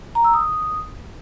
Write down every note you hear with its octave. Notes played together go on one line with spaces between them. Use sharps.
A#5
E6
D#6